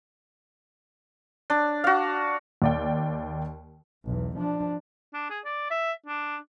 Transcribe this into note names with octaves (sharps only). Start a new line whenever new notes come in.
D4
F#4 F5
D#2 D5 G5
B1 E2
F3 D4
D4
G#4
D5
E5
D4